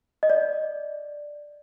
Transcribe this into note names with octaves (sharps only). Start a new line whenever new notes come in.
D#5
D5